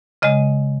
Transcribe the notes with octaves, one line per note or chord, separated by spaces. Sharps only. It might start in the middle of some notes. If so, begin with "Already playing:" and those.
C#3 G#3 D#5